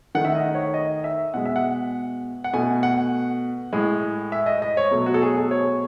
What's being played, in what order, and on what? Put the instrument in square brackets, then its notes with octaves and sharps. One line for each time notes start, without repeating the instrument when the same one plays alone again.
[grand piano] D#3 A3 F#5
E5
D#5
C#5
D#5
E5
B2 G#3 F#5
E5
F#5
F#5
B2 A3 G#5
F#5
A2 G#3
E5
D#5
D#5
C#5
B2 F#3 A3
F#4
A4
G#4
A4
C#5